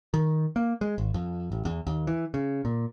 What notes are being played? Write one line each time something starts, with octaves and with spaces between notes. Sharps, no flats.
D#3
A#3
G#3
G#1
F2
A1
E2
D#2
E3
C#3
A#2